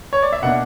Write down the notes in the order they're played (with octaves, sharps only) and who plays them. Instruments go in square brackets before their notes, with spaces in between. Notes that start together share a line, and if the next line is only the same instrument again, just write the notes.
[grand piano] C#5
D5
E5
B2 A#3 D4 F#5